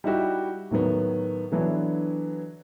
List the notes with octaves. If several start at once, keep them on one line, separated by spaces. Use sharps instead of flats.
G3 D#4 E4 F#4 G4
A2 D#3 F#3 B3
D3 E3 F#3 B3 D4 E4